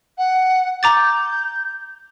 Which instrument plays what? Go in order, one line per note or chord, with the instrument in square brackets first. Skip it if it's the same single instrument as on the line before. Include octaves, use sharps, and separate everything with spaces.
[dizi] F#5
[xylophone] A#5 D6 A6 [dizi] G6